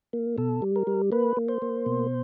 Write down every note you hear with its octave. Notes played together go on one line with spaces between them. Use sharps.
A#3
B2 A4
G3
A#4
G3
A#3 B4
A#3
C5
A#3
B2